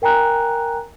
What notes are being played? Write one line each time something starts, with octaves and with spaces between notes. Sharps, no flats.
A#4 G5 G#5 A#5 F#6